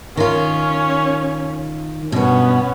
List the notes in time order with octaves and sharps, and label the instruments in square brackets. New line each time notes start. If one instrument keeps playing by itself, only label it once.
[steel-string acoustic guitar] D#3 F4 [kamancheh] C#4
[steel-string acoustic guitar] G2 B2 [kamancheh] B3 C#4